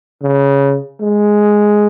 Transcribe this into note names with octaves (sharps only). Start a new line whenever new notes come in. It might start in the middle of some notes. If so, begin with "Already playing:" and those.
C#3
G#3